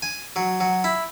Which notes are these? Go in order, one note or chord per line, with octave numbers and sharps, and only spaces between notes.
G#5
F#3
F#3
E4